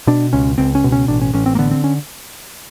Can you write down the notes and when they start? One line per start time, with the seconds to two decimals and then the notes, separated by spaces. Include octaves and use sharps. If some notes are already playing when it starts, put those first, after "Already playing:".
0.07 B2 D4
0.33 C#2 C#4
0.58 C#2 C4
0.75 C#4
0.84 B2
0.92 C#4
1.08 A1 D4
1.22 C#4
1.33 A1 C#4
1.46 C4
1.55 A#3
1.59 D3 B3
1.71 C4
1.84 C#4